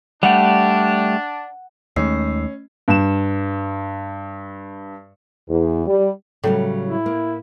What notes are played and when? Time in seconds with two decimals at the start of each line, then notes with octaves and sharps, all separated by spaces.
0.23 G3 A3 D4 G4 F#5
1.96 D#2 D#3 G#3 A3 C#4 E6 C7
2.88 G2 E7
5.49 E2
5.87 G3
6.44 A2 C#3 F#3 G3
6.85 E4
7.06 A#3